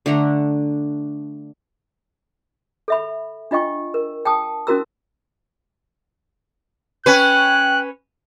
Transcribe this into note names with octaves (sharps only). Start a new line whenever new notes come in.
D3 A3 D4 A#5
A4 E5 B5
D4 F4 D#5 G5 C#6
A#4
G5 A5 D#6
C#4 E4 F#4 A#4 A#5 E6
C#4 B4 G5 F#6